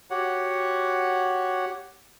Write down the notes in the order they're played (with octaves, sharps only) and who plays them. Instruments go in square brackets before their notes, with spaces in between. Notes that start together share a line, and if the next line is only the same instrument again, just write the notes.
[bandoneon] F#4 G4 C#5 F#5